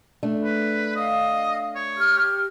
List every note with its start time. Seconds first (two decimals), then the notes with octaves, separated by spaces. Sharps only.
0.23 A3 D4
0.44 B4
0.96 D#5 F5
1.76 C#5
1.97 G4 F6